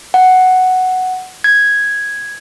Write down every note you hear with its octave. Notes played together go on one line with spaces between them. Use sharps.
F#5
G#6